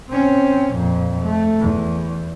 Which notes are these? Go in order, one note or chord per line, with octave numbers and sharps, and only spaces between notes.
C4 C#4
F2 A#2
A3
E2